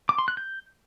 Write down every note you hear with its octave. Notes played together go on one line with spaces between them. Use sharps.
D6
C6
F#6
G6